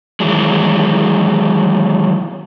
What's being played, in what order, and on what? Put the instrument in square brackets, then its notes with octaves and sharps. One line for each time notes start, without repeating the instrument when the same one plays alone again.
[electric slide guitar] D#3 E3 F#3 G#3